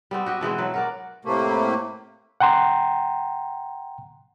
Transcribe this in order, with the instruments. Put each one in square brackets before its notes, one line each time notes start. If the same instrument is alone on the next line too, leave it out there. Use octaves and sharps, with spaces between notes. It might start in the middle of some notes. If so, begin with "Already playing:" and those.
[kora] G3 B3 C4
F#4 G4 D#5
B2 E3 G#3 C4
F#3 B4
F#4 A#4 D5
[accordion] A2 C3 A3 A#3
[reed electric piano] F#5 G5 A#5 C6